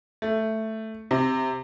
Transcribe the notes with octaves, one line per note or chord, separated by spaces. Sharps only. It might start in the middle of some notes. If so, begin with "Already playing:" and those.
A3
C3